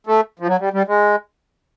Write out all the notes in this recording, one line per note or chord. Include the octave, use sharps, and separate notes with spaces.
A3
F3
F#3
G3
G3
G#3